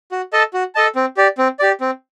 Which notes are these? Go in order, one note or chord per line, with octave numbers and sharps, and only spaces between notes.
F#4
A4 D#5 A5
F#4
A4 D#5 A5
C4
G4 D5
C4
G4 D5
C4